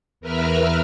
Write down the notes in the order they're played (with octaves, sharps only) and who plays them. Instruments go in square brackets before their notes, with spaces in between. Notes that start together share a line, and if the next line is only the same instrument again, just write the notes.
[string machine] E2 A#4 B4 E5 F6